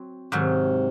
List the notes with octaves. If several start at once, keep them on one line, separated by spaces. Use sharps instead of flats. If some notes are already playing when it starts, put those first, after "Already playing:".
Already playing: F#3 C4
G#2 C3 D#3 F#3